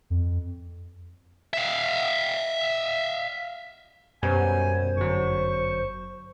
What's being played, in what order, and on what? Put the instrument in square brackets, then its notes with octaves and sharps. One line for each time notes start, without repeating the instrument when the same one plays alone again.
[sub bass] F2
[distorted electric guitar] E5 F5
[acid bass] F#2 [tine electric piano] B2 G3 B3 [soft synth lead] C5 [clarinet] G#5
[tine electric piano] G1 F#3 [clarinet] C#6